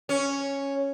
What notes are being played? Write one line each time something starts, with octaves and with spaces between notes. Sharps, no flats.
C#4